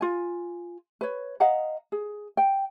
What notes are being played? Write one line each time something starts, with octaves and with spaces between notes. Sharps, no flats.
F4 G#5
B4 C#5
D#5 F5 F#5 A#5
G#4
G5